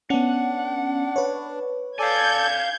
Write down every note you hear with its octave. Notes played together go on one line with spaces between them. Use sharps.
B3 C#4 D4 F#5
B4 C#5
A4 D5 F5 G#5 G6 G#6